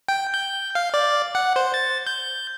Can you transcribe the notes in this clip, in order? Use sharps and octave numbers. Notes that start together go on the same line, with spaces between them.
G5
G6
F5
D5
F#5
C5
A6
G6